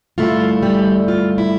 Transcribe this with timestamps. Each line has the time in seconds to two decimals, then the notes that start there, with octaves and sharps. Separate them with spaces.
0.18 G2 D3 A3 E4 F4
0.63 G3 G4
1.08 F4
1.38 E4